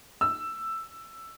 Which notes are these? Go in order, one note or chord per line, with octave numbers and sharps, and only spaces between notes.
E6